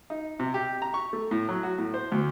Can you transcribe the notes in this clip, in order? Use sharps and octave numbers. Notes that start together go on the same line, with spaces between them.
D#4
C3
G4
A#5
C#6
A3
A2
F#3
F#4
A2
C5
D2